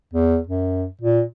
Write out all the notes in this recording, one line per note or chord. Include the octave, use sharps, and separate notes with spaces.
E2
F#2
A#2